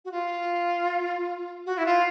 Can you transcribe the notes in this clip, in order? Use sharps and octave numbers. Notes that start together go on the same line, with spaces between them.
F#4
F4
F#4
E4
F4